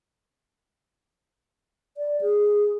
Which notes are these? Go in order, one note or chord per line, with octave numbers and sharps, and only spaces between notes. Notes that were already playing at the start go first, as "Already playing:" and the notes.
D5
G#4